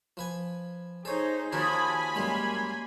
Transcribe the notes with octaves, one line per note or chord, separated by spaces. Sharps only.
F3 B4 G#5
D#4 G#4 A4 C5 C#5
D#2 F3 F#4 A#4 C5 G#5 B5 G#6
F#2 G3 G#3 A#3 C6 G#6